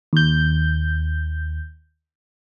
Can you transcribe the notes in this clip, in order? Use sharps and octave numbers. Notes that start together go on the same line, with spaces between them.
D#2 G6